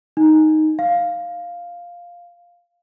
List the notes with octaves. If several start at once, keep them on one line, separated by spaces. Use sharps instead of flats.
D#4
F5